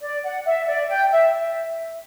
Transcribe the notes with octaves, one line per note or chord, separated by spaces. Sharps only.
D5
F#5
E5
D5
G5
E5